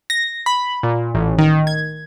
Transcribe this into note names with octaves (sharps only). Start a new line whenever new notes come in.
A#6
B5
A#2
A1
D#3
G#6